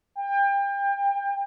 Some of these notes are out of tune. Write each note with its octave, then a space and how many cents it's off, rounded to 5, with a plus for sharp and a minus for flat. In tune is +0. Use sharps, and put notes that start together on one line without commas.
G5 +30